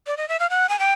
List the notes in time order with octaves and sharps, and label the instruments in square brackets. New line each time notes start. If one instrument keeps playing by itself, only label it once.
[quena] D5
D#5
E5
F5
F#5
G#5
G5